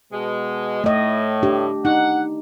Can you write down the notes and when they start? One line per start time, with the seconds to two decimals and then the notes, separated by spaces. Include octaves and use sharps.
0.12 B2 G#3
0.84 A2 A3 D#5
1.43 D4 G4
1.85 D#4 F#5